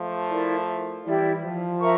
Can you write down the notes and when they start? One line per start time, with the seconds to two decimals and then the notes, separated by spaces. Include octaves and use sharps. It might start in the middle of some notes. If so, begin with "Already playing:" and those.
Already playing: F3 A3
0.29 E4 A#4 D5
1.05 E3 G3 E4 G4 D5
1.44 F3
1.81 A#4 E5 A#5 C#6